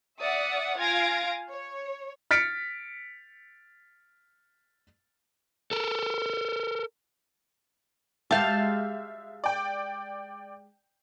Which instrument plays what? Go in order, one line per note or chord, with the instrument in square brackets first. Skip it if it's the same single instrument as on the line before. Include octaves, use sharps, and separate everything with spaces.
[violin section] D5 E5 F#5 D#6
F4 F5 G#5 G#6 A#6 D7
C#5
[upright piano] F6 A6 B6 C#7 D7
[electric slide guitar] A4 A#4
[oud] G#3 F#4 G4 [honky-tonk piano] E5 G6 A6 [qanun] F5 A5
[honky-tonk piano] D5 G5